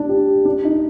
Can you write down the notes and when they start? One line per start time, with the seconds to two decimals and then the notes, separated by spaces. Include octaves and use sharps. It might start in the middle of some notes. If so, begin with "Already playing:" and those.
Already playing: D4
0.09 G4
0.45 D4
0.64 D#4